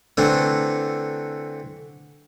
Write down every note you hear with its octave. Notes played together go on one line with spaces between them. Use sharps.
D3 E3 A3 C4 D4